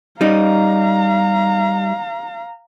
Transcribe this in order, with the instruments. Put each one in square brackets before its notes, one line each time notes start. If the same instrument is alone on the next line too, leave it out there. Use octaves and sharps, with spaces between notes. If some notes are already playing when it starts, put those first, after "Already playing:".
[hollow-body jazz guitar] G3 D#4 [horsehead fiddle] F5 A#5